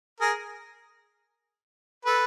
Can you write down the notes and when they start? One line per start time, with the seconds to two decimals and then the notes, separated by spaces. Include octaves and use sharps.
0.20 G#4 A#4
2.05 A4 B4